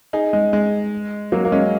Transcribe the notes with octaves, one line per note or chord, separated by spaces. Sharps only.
D#4 G#4
G#3
G#3
F#3 A#3
A#3
G#3 C#4